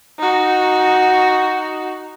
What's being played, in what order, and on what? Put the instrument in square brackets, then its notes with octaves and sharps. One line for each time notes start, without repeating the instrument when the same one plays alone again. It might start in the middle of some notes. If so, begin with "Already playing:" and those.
[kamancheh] D#4 F#4